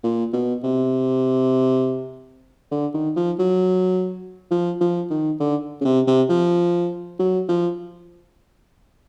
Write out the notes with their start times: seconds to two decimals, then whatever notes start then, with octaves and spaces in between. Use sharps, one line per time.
0.03 A#2
0.33 B2
0.63 C3
2.71 D3
2.94 D#3
3.16 F3
3.39 F#3
4.51 F3
4.81 F3
5.10 D#3
5.40 D3
5.81 C#3
5.85 C3
6.07 C3
6.29 F3
7.19 F#3
7.49 F3